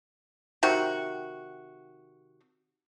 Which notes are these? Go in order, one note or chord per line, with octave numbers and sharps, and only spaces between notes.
C3 D#3 F#4